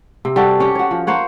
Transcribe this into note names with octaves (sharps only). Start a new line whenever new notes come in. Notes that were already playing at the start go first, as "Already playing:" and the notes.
C3
G3 F#4 A4
C#4 G4
F#4 C#5
F3
A#3 C5 C#5 F#5